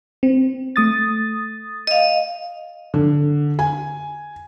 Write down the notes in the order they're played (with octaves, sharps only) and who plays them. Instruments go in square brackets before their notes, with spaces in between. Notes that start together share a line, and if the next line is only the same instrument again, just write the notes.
[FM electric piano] C4
A3 D#6 A6
[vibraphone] D#5 F5
[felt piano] D3
G#5